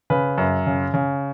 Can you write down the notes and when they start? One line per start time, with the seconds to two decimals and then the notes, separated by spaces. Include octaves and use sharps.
0.10 C#3 B4
0.38 F#2
0.67 C#3
0.94 C#3